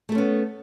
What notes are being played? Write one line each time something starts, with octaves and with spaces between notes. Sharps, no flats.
A3 B3 C#4 A4